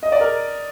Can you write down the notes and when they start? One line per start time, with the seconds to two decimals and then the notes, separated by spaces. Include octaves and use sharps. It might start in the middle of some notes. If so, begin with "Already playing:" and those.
0.03 D#5
0.12 D5
0.21 A#4